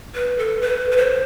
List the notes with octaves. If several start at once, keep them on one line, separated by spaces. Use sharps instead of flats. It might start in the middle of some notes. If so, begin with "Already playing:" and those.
B4
A4
B4
B4
C5